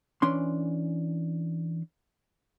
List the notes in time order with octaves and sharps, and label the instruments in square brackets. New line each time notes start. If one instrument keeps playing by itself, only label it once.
[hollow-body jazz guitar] E3 C#4 D4 C6